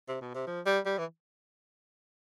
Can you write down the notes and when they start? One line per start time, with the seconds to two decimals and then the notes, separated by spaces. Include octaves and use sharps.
0.09 C3
0.21 B2
0.34 C3
0.47 F3
0.66 G3
0.86 G3
0.98 E3